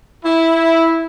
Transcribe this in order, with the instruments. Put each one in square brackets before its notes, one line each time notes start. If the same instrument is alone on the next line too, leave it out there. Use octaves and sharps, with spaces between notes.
[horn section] E4